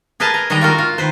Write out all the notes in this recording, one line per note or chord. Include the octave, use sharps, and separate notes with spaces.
G#4 A#4 B4 D#5 G#5 A5
A#5
D#3 G3 G#3 D#5 A#5
F4 F#4 A#4
F4
D#3 B4 C5